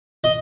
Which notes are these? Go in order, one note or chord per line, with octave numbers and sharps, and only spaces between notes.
D#5